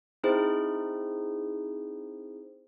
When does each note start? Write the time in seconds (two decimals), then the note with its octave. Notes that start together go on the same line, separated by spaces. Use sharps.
0.24 C4 D#4 E4 G#4 C5